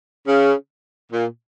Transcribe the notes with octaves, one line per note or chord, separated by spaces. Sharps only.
C#3
A#2